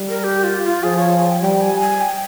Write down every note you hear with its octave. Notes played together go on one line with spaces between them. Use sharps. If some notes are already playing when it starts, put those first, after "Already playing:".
Already playing: G3
A#4
G4
F4
F4
F3 G#4
C#5
G#5
G5
G3 G5
G#5
G#5
G5